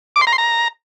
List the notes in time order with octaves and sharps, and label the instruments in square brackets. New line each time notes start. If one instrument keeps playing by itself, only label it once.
[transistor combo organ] D6
C6
A#5
C6
A#5